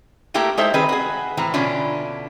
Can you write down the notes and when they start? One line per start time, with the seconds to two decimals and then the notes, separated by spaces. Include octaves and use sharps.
0.34 A3 A#3 E4 G4 A4 A#4
0.57 G#3 D#4 A4 C5 E5
0.74 D#3 G3 C4 G#4 B4
0.89 F#4 G#4
1.37 A2 E3 C4 A#5
1.54 B2 D3 C#4 D4 E4 F4